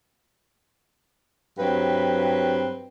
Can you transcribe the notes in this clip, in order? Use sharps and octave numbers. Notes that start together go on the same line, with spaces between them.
G2 F#3 C4 B4